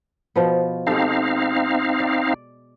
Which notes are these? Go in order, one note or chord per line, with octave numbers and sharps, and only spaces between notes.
B2 F3 B3
G#3 C4 D#4 G4 A4 F5
D5